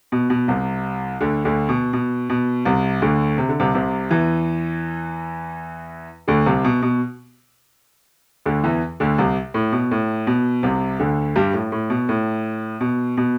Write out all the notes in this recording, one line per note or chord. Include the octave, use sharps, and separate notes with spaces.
B2
B2
C2 C3
D2 D3
D2 D3
B2
B2
B2
C2 C3
D2 D3
C3
D3
C2 C3
C2 C3
E2 E3
D2 D3
C2 C3
B2
B2
D2 D3
E2 E3
D2 D3
C2 C3
A2
B2
A2
B2
C2 C3
D2 D3
G2 G3
A2
A2
B2
A2
B2
B2